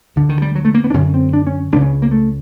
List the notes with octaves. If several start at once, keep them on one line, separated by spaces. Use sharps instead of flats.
D2 D3
D#3
G3
F#3
A3
A#3
B3
D4
F#2 D3 C#4
C4
D4
C#4
C#2 C#3 D4
C#4
A#3
A3